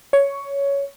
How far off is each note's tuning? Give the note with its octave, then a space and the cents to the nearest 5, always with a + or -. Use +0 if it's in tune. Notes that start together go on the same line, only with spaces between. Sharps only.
C#5 +10